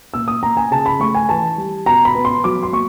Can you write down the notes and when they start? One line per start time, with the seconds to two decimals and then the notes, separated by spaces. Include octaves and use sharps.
0.14 A#2 E6
0.28 D#6
0.43 A#3 A#5
0.57 G#5
0.71 C#3 A5
0.86 B5
1.00 A3 C#6
1.15 G#5
1.29 E3 A5
1.58 G3
1.86 B2 A#5
2.05 B5
2.15 B3
2.25 C6
2.44 F#3 D6
2.63 C6
2.72 A#3 C#6